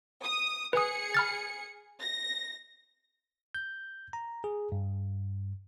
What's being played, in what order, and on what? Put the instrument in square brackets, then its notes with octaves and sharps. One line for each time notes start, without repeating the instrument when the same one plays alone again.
[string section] D#6
[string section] G#4 C#7 [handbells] B4 D#6
[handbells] B5 F6 A6
[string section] A#6
[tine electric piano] G6
A#5
G#4
G2